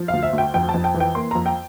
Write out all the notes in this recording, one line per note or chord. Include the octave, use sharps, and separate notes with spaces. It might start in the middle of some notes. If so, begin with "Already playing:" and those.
Already playing: F3
D2 F5
E5
D2
G5
F2 G5
A5
F2
G5
E3
G5
A#3 C6
F2 A#5
G5